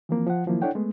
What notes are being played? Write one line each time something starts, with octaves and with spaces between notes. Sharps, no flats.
E3 F3 A#3 C4
F3 F#5
D#3 F3 F#3 A#3 E4
D4 E4 A4 C#5 F#5 G5
G#3 A3 B3